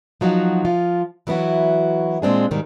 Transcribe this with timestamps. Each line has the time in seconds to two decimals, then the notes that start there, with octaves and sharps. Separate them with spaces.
0.21 F3 F#3 D#4 F#4
0.65 F3 F4
1.27 E3 F#3 B3 E4 F#4
2.22 A#2 G#3 C4 D4 G#4
2.51 G#2 B2 D#3 G3